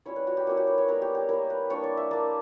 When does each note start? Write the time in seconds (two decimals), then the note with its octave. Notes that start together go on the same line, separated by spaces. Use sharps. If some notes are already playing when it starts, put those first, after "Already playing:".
0.06 G3 C#4 E4 C#5
0.16 B4
0.27 F#4
0.37 G4
0.47 A#3 C#4 E4 F#4
0.57 G4
0.67 B4
0.78 C#5
0.88 G3 B3 E4 A#4
1.02 G4
1.15 G4
1.29 A#3 E4 A#4
1.50 B4
1.70 G3 A#3 D4 C#5
1.84 D5
1.97 E5
2.11 A#3 D4 D5